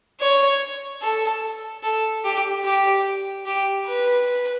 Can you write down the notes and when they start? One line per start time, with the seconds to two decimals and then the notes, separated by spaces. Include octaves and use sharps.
0.20 C#5
1.02 A4
1.83 A4
2.25 G4
2.64 G4
3.46 G4
3.86 B4